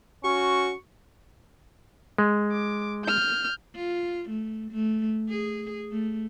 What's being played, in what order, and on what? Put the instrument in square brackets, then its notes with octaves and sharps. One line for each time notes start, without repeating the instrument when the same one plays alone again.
[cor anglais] C#4 [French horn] F#4 [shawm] C#6
[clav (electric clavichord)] G#3
[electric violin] D6
F6 G6
[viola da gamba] F4
A3
A3
G#4
A3